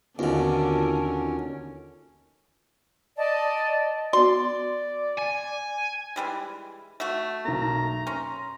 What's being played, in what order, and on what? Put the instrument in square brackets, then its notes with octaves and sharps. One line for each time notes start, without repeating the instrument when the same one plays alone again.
[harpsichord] D#2 B2 [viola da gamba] D3 A#4 [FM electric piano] B3 D#4 F4 [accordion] C#4
[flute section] D5 A5 [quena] D#5
[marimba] B3 F#4 [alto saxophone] D5 [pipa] C6
[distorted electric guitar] G#5
[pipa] E3 G3 G#3
A3 F#4
[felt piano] B1 A#3 [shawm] A#5
[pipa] C#4 [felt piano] C6